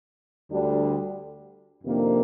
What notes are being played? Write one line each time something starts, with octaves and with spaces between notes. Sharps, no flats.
D2 D3 G3 D4 G4
F2 C3 D#3 A#3 D4